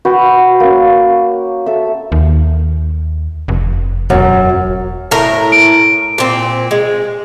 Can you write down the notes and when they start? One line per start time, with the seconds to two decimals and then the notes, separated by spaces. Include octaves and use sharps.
0.05 F#4 B4 G5
0.60 A#3 C#4
1.66 A4 E5
2.12 D#2
3.48 F1
4.10 E1 F#2
5.11 A2 A#4
5.52 D7
6.18 A#2 C4
6.71 G#3